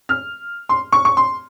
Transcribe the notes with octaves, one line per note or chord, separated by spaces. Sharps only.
F6
C6
C#6
C#6
C6